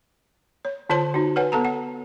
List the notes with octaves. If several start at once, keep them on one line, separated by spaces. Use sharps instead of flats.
C#5
D3 F4 C5 C#5 A5 C6
D#4 F#4
B4 C#5 F#5 G#5
B3 A4 A5 A#5
F#5